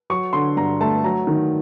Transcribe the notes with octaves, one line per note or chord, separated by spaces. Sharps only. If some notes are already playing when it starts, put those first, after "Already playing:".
F#3 C#6
D3 C6
G2 A#5
A3 A5
F#3 A#5
D#3